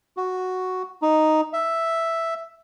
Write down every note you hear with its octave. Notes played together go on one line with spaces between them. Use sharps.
F#4
D#4
E5